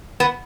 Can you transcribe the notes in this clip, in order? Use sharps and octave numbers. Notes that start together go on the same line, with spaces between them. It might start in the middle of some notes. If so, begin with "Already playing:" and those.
B3